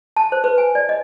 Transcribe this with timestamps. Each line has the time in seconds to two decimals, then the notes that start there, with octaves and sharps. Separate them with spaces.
0.17 A5
0.32 C5
0.44 B4
0.58 G#5
0.75 D5
0.89 D#5